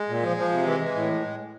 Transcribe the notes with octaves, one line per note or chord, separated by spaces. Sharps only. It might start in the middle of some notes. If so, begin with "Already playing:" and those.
Already playing: G#3
A#2
F3
F3
C3
E3
E3
A2